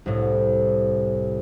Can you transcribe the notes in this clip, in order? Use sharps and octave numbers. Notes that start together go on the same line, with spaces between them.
C2 A2